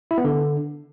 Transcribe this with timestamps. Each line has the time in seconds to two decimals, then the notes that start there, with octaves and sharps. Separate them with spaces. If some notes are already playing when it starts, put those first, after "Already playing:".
0.11 E4
0.18 B3
0.25 D3